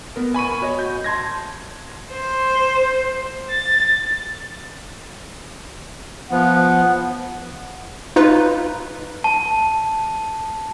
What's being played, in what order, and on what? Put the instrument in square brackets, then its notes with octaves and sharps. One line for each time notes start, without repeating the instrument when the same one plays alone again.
[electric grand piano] B3 A#4
G#5 B5 C#6 D#7
F#4 C#5 D#5
G6
A5 C6 G#6 A#6
[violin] C5
A6
[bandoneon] F3 B3 [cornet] F#5
[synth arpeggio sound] D#4 F4 B4
[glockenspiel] A5